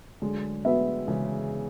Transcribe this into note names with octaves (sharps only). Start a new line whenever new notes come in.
D3 F#3 G#3
B3 F#4 B4 E5
C#3 E3 G#3